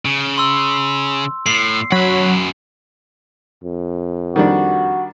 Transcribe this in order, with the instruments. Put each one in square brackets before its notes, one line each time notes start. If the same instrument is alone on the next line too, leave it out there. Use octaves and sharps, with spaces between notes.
[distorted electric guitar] C#3
[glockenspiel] C6 E6
[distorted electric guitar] A2 [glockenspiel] C7
[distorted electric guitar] F#2 B5 [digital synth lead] F#3
[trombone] F2
[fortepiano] D#3 G3 D4 [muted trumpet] F#4